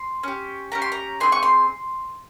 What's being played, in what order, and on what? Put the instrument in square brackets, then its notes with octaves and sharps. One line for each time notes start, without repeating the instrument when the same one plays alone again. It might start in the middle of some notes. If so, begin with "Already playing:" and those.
Already playing: [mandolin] C6
C#4 G4
C#4 G4 A#5
C6
A#5
C4 D#4 G#4 C6
C#6
C6